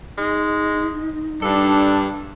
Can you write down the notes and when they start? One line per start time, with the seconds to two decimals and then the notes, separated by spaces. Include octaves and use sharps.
0.18 G#3 D#4
1.42 G2 D4 A4